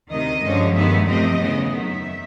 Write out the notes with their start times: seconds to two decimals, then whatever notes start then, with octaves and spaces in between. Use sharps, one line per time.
0.10 D2 C3 D#3 D#5
0.43 G2 D3 F3 G#3 C#4
0.75 G2 D#3 G#3 B3 E5
1.07 E2 C3 F3 A3 C4 D#5
1.40 E2 C#3 F#3 B3
1.72 F#2 D#3 F#3 E5